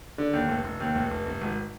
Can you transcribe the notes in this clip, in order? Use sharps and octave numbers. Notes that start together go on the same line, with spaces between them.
D3
D#2
F1
F1
D#2
F1
F1
F1
G#1